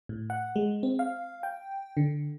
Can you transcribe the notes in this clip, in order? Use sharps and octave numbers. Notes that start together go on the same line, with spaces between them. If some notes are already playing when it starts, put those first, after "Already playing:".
A2
F#5
G#3
C4
F5
G5
D3